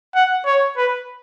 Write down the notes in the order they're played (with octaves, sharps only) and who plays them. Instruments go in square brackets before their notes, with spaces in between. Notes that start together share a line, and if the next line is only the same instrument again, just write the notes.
[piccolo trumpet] F#5
C#5
B4